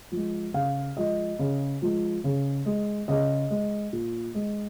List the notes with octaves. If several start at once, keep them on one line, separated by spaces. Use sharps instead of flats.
F3
G#3
C#3 F5
F3 G#3 D#5
C#3
F3 G#3
C#3
G#3
C#3 D#5
G#3
A#2
G#3